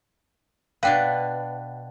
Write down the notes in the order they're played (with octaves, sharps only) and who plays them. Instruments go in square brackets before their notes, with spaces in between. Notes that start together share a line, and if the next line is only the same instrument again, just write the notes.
[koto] B2 D4 B4 [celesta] F5 G5